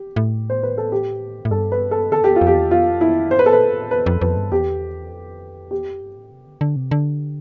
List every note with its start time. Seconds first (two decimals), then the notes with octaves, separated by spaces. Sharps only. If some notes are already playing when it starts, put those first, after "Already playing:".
Already playing: G4
0.16 A2
0.50 C5
0.63 B4
0.78 A4
0.92 G4
1.45 A2
1.51 G2 A4
1.72 B4
1.91 A4
2.11 D3 A4
2.21 G2
2.24 F2 G4
2.36 F4
2.41 F2
2.47 G4
2.56 E2
2.71 F2 F4
3.01 E4
3.31 G2 C5
3.39 B4
3.46 A2 A4
3.53 B4
3.62 B2
3.71 G2
3.77 A2
3.91 F2 B4
4.06 F2
4.21 F2 B4
4.37 G2
4.52 E2 G4
5.12 F2
5.71 E2 G4
5.87 F2
6.01 G2
6.16 A2
6.32 C3
6.46 D3
6.61 D3
6.76 C3
6.91 D3